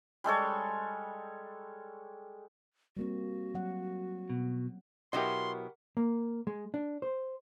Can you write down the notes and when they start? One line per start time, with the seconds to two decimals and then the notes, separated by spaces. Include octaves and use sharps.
0.24 G3 G#3 A4 C#5
2.97 G3 A#3 C4 F#4
3.55 F#3 F#5
4.30 B2
5.13 B2 F#3 E4 G4 A#4 D#5 F#5 C6
5.97 A#3
6.47 G#3
6.74 D4
7.02 C5